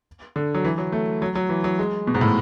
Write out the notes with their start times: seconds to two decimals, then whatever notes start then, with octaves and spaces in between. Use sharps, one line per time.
0.36 D3
0.54 F#3
0.64 E3
0.78 F#3
0.92 A3
1.22 F#3
1.35 F#3
1.49 E3
1.64 F#3
1.79 G#3
2.07 B2
2.14 G#2
2.21 A2